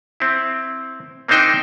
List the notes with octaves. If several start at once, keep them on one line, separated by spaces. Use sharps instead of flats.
C4 E4
A#3 C4 D4 D#4 C5 G5